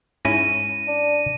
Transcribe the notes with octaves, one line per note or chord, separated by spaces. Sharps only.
G#2 C#4 E4 A#6 D#7
D4